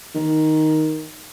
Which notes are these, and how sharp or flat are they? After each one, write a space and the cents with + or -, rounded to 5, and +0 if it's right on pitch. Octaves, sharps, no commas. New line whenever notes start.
D#3 +5